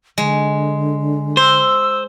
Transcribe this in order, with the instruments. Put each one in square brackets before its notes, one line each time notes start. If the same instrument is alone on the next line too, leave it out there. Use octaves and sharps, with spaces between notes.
[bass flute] D3 [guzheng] G#3
[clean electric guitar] C5 [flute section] E6